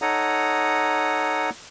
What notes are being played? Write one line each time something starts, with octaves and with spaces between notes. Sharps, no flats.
D#4 A4 C#5 F#5 A#5 D#6